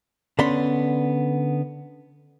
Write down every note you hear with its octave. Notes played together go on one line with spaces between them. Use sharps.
D3 B3 C#4 D5 B5 C6